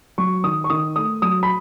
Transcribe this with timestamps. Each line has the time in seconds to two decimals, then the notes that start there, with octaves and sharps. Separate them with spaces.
0.18 F#3 C#6
0.44 D#3 D#6
0.64 C#6
0.70 D#3 D#6
0.96 A3 D#6
1.22 F#3 D#6
1.43 B5